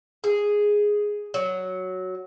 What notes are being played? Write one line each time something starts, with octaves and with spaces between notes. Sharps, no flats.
G#4
F#3